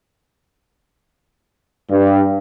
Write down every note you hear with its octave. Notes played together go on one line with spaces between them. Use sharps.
G2